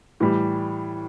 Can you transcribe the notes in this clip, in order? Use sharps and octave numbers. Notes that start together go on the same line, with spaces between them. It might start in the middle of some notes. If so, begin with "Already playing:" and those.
A2 E3 G3